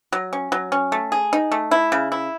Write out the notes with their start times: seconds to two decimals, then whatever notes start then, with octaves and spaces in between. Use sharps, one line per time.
0.12 F#3
0.33 C#4
0.52 F#3
0.72 C#4
0.92 A3
1.12 G#4
1.33 D#4
1.52 A3
1.71 E4
1.92 C#3
2.12 E4